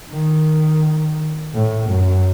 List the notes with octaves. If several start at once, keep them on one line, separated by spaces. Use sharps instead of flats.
D#3
A2
F#2